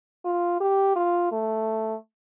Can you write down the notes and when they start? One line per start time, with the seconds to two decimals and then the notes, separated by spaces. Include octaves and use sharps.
0.25 F4
0.60 G4
0.96 F4
1.32 A3